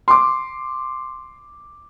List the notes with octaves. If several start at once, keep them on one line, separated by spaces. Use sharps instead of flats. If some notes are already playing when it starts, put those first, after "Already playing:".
C6 D6